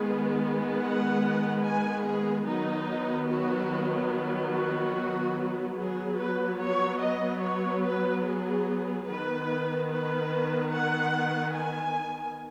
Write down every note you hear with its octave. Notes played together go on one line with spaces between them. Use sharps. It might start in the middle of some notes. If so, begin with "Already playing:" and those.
Already playing: D#3 G#3 B3 G#4
F#5
G#5
G#4
D#3 F#3 B3 D#4
F#4
F#4
F#3 B3 G#4
B4
C#5
D#5
C#5
B4
G#4
D#3 B3 B4
B4
F#5
G#5